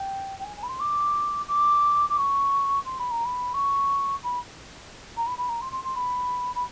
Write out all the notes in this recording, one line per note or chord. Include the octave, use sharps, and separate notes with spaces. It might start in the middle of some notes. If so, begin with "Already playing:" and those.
Already playing: G5
G5
G#5
G#5
B5
C6
D6
D6
D6
C#6
C6
B5
A#5
B5
C#6
B5
A#5
B5
B5
A#5
C6
C6
C6
B5
B5